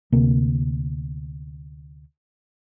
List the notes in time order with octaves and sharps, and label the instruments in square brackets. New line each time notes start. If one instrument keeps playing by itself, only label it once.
[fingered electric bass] D2 C3 A#3